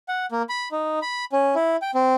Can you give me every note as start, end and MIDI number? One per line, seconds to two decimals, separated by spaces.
0.08 0.26 78
0.32 0.43 58
0.49 0.68 83
0.72 0.99 63
1.02 1.25 83
1.32 1.55 61
1.55 1.76 64
1.82 1.91 79
1.95 2.16 60